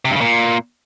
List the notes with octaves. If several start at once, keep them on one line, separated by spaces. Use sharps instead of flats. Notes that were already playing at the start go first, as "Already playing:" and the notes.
C3
G2
C#3
A#2